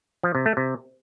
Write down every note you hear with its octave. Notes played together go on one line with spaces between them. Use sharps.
F3
C3
A3
C3